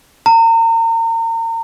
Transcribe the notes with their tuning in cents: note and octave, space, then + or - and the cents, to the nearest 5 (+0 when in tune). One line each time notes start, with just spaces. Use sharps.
A#5 -35